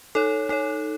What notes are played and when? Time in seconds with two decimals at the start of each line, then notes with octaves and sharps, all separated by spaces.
0.15 D#4 A4 C#5
0.49 D#4 A4 C#5